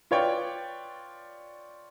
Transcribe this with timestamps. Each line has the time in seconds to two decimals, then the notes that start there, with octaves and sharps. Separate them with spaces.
0.11 F4 B4 C#5 D5 G5